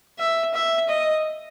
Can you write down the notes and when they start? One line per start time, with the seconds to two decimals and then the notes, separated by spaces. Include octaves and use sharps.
0.19 E5
0.54 E5
0.89 D#5